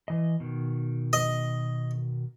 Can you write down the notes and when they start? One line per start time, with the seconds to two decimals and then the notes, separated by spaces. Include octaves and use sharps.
0.08 E3 D#5
0.40 B2 D#3
1.13 D#5